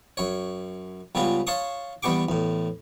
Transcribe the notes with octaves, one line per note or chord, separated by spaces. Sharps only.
F#2 C#5
C#2 G3 B3 C#4 F4
C#5 F5 A5 C6 C#6 D#6
E2 G3 B3 G4 C#6 D6
E2 A2